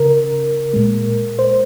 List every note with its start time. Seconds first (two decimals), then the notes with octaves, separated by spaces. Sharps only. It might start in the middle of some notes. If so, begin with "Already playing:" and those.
Already playing: C#3 A#4
0.73 A#2 G#3
1.39 C5